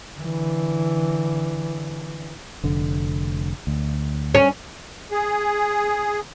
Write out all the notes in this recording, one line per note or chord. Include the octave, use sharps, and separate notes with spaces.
D3 E3
F1 D3
D2
C#4
G#4